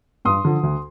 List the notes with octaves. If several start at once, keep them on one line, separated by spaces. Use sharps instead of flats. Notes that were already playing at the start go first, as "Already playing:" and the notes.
G2 C6 D#6
D3 F3
D2